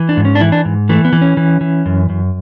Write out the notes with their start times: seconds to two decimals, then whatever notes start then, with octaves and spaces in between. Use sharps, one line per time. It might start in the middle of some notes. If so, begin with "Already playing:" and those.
Already playing: E3
0.09 D4
0.17 G#2
0.25 C#4
0.35 D4
0.40 E3 E4
0.52 D4
0.65 G#2
0.89 E3 A3
1.05 B3
1.13 E3
1.21 C#4
1.37 E3
1.61 E3
1.86 F#2
2.10 F#2